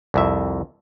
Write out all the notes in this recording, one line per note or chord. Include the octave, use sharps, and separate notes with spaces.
C2 F2 E5